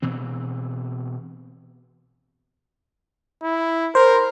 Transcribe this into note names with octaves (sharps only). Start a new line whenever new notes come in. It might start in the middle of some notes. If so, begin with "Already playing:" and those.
B2 E3 C4
E4
A#4 C5